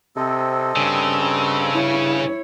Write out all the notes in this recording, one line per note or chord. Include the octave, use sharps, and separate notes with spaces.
C3 C4 A4 D#5
G2 C#3
G2 E4 C#5